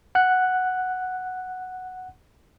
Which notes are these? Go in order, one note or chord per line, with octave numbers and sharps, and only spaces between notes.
F#5 F#6